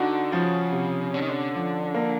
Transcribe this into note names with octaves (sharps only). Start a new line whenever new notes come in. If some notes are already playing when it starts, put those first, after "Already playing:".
Already playing: D3 D#4 F#4
C#3 F3
C3
D3 C#4
D#3
D3
F3
A#3